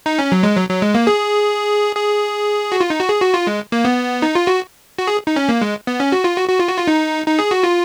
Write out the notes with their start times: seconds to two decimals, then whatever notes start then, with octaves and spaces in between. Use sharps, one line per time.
0.06 D#4
0.19 C#4
0.32 F#3
0.43 G#3
0.57 F#3
0.69 F#3
0.82 G#3
0.95 A#3
1.07 G#4
1.96 G#4
2.72 F#4
2.80 F4
2.90 D#4
3.00 F#4
3.09 G#4
3.22 F#4
3.34 F4
3.47 G#3
3.72 A#3
3.85 B3
4.22 D#4
4.35 F4
4.47 F#4
4.98 F#4
5.07 G#4
5.27 D#4
5.36 C#4
5.49 A#3
5.61 G#3
5.87 B3
6.00 C#4
6.12 F#4
6.24 F4
6.37 F#4
6.49 F#4
6.59 F4
6.69 F#4
6.78 F4
6.87 D#4
7.26 D#4
7.39 G#4
7.51 F#4
7.63 F4